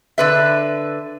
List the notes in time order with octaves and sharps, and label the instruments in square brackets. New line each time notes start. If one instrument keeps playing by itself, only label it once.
[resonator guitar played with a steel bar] D3 B4 E5